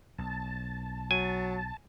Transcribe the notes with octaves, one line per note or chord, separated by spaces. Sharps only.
B1 A5
F#3 G#5